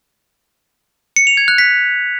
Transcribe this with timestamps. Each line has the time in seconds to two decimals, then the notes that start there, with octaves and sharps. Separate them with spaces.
1.16 C#7
1.27 F7
1.37 G#6
1.48 F#6
1.58 B6